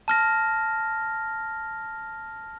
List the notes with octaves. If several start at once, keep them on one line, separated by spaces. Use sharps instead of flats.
A5 F6 A#6